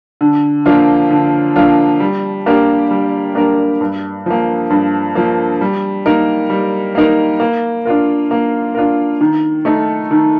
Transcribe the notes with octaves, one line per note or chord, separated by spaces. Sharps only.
D3
F3 A#3 D4 F4
D3
F3 A#3 D4 F4
G3
A#3 D4 G4 A#4
G3
A#3 D4 G4 A#4
G2
F3 A#3
G2
F3 A#3
G3
A#3 D#4 A#4
G3
A#3 D#4 A#4
A#3
D4 F4 A#4
A#3
D4 F4 A#4
D#3
A3 D#4 A4
D#3